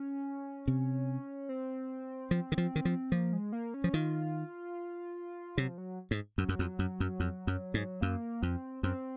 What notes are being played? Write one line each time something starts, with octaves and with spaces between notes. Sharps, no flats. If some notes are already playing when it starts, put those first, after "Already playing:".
Already playing: C#4
C3
C4
F3
D#3
F3
D#3
F3
F3 A#3
G#3
A#3
C#4
F3
D#3 F4
C3 F#3
F3
F#3
G#2
F#2 F#3
F#2
F2
F#2
F#2
F2
F#2
G#2
F#2 A#3
F2 C4
F#2 C4